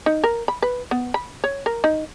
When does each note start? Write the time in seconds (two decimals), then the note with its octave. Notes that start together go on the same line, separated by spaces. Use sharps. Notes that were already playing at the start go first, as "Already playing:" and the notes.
0.06 D#4
0.24 A#4
0.48 B5
0.62 B4
0.91 B3
1.14 B5
1.44 C#5
1.66 A#4
1.84 D#4